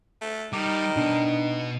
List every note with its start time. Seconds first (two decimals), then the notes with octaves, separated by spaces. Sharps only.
0.21 A3
0.53 D#3 G3 D#4 D6
0.96 B2 B3 D4